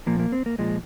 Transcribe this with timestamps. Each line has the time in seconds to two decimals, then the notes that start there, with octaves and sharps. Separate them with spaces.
0.06 A#2 F3 A#3
0.20 A#3
0.32 C4
0.46 A#3
0.58 A#2 F3 G#3